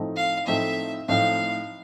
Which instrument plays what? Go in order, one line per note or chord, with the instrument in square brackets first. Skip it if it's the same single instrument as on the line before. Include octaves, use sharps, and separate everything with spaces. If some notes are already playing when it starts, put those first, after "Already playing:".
Already playing: [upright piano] A2 F3 A3 C4 D#4
[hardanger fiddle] F5
[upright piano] A2 F3 A3 C4 D#4 [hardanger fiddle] E5
[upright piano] A2 F3 A3 C4 D#4 [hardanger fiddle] F5